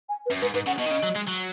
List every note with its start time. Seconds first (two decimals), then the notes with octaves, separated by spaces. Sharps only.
0.09 G#5
0.26 B4
0.31 F#2
0.42 G#2 B4
0.54 G#2 B4
0.66 C#3 F#5
0.79 B2 D#5
0.86 D#3
0.91 C#3
1.03 F#3
1.16 G#3
1.28 F#3